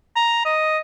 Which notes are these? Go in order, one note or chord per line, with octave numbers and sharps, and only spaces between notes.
A#5
D#5